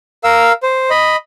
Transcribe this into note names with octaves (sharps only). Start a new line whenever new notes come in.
A#4 F5 E6
C5
D#5 B5